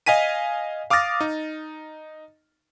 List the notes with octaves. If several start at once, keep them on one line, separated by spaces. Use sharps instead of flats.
D#5 F5 G#5 B6 D#7
F5 D6 D#6 F6 A6 A#6
D#4